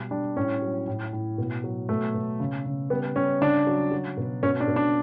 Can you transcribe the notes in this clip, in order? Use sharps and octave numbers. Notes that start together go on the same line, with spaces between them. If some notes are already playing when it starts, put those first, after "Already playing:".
Already playing: B2 G3
G3 D4
A2 C#4
F#3
A2
A2
B2
F#3
B2 A3
B2
C#3
C#3
G3 B3
G3 C#4
C#3 D4
F#3
F#3
B2
B2 C#4
D4
B2
D4